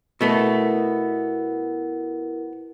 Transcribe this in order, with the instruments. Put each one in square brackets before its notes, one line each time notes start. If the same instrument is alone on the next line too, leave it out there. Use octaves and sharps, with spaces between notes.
[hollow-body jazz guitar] B2 A3 B3 [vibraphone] E4 A#4